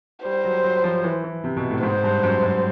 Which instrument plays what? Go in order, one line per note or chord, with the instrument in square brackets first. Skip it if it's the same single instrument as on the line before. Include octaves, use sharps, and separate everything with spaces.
[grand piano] G3 [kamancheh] C5
[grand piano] F#3
F#3
F3
E3
E3
C3
B2
A2
[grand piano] G#2 [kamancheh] C5
[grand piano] G2
F#2
F#2